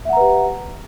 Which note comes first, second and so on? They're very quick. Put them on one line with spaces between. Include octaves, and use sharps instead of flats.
E5 F#5 A#5 B4 G4